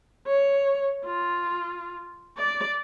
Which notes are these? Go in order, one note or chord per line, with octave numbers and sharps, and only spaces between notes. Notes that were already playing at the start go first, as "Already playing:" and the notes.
C#5
F4
D5